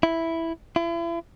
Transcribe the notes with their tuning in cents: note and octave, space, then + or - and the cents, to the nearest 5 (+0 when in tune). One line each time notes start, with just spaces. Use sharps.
E4 +0
E4 +40